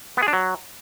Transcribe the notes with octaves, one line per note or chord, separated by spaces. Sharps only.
B3
G#4
D4
F#3